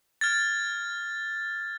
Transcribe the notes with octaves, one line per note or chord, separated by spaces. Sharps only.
F6 G#6 A6